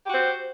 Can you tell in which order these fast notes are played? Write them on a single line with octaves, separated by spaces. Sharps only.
G4 F#4 C5